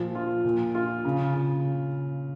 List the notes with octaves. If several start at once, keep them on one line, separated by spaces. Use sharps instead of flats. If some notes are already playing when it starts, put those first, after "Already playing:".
Already playing: A#2 F3
F4
A#2
F4
C#3
C#3